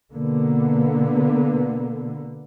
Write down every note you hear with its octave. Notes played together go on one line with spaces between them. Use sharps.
B2 D3 A#3 B3